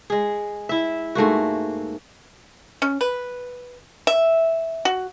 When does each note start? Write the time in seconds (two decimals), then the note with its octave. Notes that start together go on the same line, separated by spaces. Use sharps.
0.10 G#3 G#4
0.69 E4 E5
1.15 G#2 A3 A#3 F#4
2.82 C#4
3.01 B4
4.07 E5
4.85 F#4